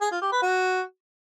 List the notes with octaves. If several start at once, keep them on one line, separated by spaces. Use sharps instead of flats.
G#4
F4
G4
B4
F#4